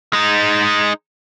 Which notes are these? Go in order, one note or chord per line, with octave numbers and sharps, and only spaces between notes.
G#3 D#4